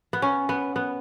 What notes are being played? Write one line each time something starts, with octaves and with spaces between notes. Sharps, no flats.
B3
C#4
B3
B3